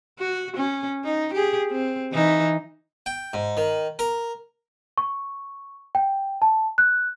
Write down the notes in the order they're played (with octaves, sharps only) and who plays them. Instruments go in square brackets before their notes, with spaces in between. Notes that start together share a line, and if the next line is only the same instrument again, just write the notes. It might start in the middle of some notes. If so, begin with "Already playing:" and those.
[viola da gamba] F#4
C#4
D#4
G4 G#4
C4
E3 D#4
[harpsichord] G5
G#2
D#3
A#4
[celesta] C#6
G5
A5
F#6